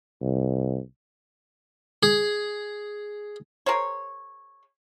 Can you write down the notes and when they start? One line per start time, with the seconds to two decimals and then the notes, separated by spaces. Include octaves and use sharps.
0.21 C2
2.03 G#4
3.66 G#4 A#4 C5 C#5